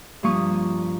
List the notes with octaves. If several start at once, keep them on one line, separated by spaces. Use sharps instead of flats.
G2 F3 A#3 C#6 D#6